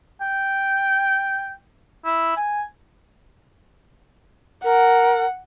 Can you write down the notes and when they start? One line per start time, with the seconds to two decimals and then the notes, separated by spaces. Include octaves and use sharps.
0.21 G5
2.05 E4
2.37 G#5
4.64 A#4 F#5